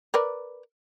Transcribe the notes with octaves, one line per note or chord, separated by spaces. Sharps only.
A#4 B4 D5